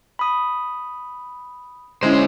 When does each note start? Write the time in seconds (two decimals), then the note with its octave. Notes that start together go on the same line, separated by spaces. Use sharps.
0.19 B5 D#6
2.03 D3 G#3 C#4 E4 C5